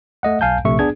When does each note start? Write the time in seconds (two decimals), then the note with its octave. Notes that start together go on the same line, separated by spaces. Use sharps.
0.23 A3 D#5 F#5
0.41 B1 F5 G#5 A5 G6
0.65 A#1 C3 A3 E5 C#6
0.79 B3 D4 G#4 G#6